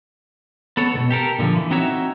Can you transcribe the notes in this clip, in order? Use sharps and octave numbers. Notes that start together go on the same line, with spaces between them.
B3 A4 C#5
C#2 B2
G4 A4 A#4
A#2 D3 D#3 F3
E3
C4 D#4 F#4 C#5 E5